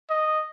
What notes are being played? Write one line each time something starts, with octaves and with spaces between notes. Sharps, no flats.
D#5